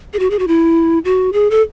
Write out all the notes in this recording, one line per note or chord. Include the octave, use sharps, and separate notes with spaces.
G#4
F#4
G#4
F#4
E4
F#4
G#4
A4